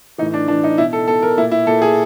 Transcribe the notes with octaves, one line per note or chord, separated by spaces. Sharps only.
A2 E3 D#4
D4
A2 E3 D4
D#4
B2 E4
A4
B2 A4
A#4
A#2 E4
E4
A#2 A4
G#4